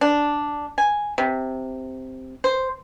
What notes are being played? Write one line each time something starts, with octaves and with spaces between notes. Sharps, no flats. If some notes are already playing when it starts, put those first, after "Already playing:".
D4
G#5
C3
C5